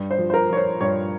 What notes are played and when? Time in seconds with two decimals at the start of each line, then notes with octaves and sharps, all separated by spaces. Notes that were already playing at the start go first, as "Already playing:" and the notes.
Already playing: G2
0.11 C5
0.19 F3
0.30 C5
0.34 A#4
0.50 F3 C#5
0.57 C5
0.80 G2 C#5